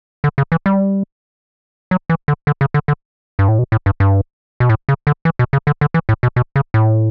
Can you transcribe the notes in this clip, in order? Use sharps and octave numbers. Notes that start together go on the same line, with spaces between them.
D3
C#3
E3
G3
F#3
E3
D3
D3
C#3
D3
D3
G2
A2
B2
A2
G2
G2
B2
A2
C#3
D3
E3
B2
C#3
D3
D3
E3
A2
B2
B2
C#3
A2